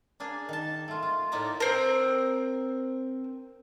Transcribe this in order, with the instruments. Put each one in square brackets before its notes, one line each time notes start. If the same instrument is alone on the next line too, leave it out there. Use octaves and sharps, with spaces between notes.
[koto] A#3 D4 G#4
D#3 A5
A3 F4
F4
A2 A#3 D#4 D5 E5 A#5
[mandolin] C4 A#4